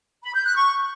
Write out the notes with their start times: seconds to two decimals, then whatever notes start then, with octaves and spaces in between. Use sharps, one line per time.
0.23 B5
0.34 G6
0.45 F#6
0.55 C#6